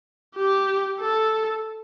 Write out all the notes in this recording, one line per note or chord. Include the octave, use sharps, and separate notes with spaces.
G4
A4